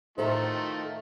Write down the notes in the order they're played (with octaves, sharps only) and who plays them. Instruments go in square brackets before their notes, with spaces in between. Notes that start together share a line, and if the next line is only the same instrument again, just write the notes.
[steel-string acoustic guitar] A2 A4 A#5 [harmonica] D#3 A3 F4 [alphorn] D#4 [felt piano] C5